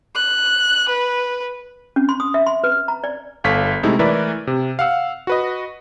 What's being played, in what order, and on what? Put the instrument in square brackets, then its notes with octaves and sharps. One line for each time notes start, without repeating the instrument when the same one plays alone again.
[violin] F#6
B4
[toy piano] C#4
C6
D#6
E5
C6
B4
A#5
D5
[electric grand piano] G1 A4 C#5 F5 F6 B6
C3 G#3 A3 D#4 E4 E5
E3 A3 A#4 B4 D5 E5
C3
F5 F#5 E6
F#4 B4 D#5